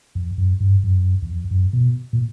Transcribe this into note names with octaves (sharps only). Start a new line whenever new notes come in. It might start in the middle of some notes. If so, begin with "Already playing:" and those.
F2
F#2
G2
F#2
E2
F2
F#2
B2
A#2